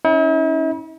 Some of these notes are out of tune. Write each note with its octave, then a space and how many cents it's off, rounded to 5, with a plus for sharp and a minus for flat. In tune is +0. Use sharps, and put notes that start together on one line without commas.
C#4 +0 E4 -45